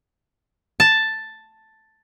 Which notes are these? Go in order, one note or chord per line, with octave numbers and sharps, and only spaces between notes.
A5